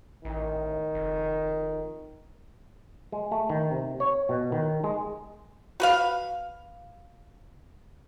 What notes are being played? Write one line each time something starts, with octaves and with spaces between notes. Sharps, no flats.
A1 D#3
F1
G#3
A3
D#3
C3
C#5
B2
D#3
G#3
F#4 B4 F5